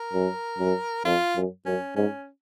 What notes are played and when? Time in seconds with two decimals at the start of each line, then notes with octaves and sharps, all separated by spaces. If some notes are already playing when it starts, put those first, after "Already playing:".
Already playing: A#4
0.13 F#2
0.59 F#2
1.05 F2 F4
1.36 F#2
1.66 F#2 C#4
1.96 G#2 C#4